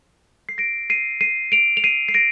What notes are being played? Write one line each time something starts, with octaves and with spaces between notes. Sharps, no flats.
C7
A#6 D7
C7 D#7
C7 D#7
D7 F7
F7
C7 D#7
C7
A#6 D7